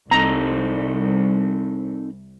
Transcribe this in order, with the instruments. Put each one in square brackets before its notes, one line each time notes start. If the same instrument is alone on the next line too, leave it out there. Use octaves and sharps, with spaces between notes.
[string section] C2 [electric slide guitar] C4 D#4 A4 [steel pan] A#5